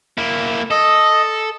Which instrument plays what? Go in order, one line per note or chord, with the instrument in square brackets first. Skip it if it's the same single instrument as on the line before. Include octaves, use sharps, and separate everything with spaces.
[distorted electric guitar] A#3 E4
[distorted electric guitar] A4 [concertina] D#5